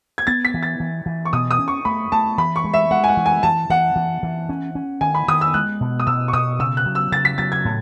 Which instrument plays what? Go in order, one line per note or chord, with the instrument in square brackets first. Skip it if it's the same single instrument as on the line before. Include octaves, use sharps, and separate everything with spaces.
[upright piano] G#6
[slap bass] B3 [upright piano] A6
[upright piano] B6
[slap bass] E3
[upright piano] A6
[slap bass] E3
E3
[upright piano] C#6
[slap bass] B2 [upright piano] D#6
[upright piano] D#6
[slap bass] C#4
[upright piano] C#6
[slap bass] A3 [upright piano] B5
[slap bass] A3 [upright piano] A5
[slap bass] E3 [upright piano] B5
[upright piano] C#6
[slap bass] G#3
[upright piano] E5
[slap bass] G#3 [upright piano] F#5
[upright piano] G#5
F#5
[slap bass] E3
[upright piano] G#5
[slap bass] E3 [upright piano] A5
[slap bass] E3 [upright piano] F#5
[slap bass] E3
E3
C#4
C#4
[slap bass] D#3 [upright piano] G#5
[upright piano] B5
[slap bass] D#3 [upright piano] D#6
[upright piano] E6
[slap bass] G#3 [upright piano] F#6
[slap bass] B2
[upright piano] D#6
[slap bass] B2 [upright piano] E6
[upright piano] C#6
[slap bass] B2 [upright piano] D#6
[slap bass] C#3 [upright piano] E6
[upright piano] F#6
[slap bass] F#3
[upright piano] E6
[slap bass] C#3 [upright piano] A6
[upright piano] B6
[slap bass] F#3 [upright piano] A6
[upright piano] G#6
[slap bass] A2